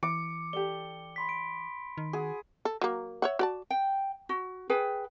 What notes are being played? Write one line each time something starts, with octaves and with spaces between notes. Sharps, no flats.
E3 D6 C#7
G4 A4 D5 G7
B5 C6 B6
D7
D#3
F#4 G#4
A4
F#3 A#3
C#5 E5 F#5
F#4 D5 A5
G5
F#4
G#4 B4 G5